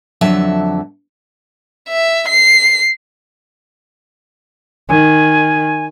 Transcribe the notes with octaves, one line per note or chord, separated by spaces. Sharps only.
F2 D3 F#3 E5 A5
E5
C7
D#3 G#5